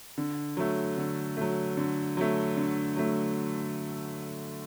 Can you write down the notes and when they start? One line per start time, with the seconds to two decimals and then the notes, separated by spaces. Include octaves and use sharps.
0.18 D3
0.57 F#3 A3
0.97 D3
1.37 F#3 A3
1.77 D3
2.17 F#3 A3
2.57 D3
2.97 F#3 A3